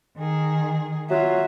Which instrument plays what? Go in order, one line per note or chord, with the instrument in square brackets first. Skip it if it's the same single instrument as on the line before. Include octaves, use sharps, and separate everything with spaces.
[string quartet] D#3 G#4
[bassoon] F#3 [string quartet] F4 [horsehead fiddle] F#4 E5